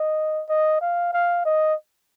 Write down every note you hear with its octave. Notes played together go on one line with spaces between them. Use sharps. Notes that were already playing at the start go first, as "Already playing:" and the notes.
Already playing: D#5
D#5
F5
F5
D#5